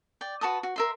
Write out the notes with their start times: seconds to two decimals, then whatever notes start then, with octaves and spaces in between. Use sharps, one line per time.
0.21 D5 G5
0.41 F#4 B4 A5 D#6
0.63 F#4
0.76 A#4 E5 C6